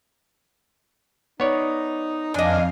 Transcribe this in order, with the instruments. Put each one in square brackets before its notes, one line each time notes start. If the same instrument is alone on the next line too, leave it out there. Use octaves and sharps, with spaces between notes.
[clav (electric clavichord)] B3 C#5 D5 [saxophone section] D#4
[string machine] F2 F5 [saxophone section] D4 [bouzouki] D#5 G#5